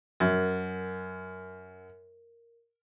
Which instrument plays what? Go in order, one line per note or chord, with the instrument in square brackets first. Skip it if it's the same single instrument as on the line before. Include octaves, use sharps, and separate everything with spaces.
[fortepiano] F#2 [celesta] A#4